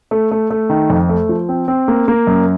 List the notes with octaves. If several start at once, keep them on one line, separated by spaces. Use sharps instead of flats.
A3
A3
A3
D#3
F2
A3
F3
C4
C4
A#3
A#3
F#2